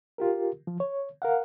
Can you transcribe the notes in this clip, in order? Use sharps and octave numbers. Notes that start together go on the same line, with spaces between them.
F4 G4 A#4
F3
C#5
A#4 F5 F#5